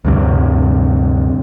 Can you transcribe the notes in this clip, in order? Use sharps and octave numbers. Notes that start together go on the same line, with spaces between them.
D2 G2 C3